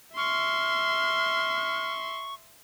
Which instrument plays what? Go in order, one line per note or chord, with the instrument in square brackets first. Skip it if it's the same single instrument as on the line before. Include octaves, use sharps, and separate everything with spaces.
[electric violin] E5 C6 [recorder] C#6 [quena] F6